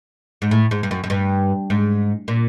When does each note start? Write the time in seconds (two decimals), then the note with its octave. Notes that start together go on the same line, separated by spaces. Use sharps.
0.42 G#2
0.51 A2
0.71 G#2
0.83 G2
0.91 F#2
1.04 F#2
1.10 G2
1.70 G#2
2.28 A#2